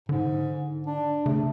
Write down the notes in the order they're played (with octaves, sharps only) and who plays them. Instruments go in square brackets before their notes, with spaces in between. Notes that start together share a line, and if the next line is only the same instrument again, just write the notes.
[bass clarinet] G#2 [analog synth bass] D3
[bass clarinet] D4
[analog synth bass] C#3 [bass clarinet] A3